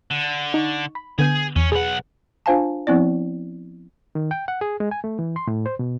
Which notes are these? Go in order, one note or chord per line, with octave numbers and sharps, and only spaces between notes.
D3
D#4 C#6
B5
D3 B3 G#4 G6
E2 C#4
B1 G#4 B4 F#5
D4 F4 C5 F5 G#5 A5
F3 B3 C4 E4 D5
D#3
G5
F#5
G#4
G#3
G#5
A3
E3
C6
A2
C5
B2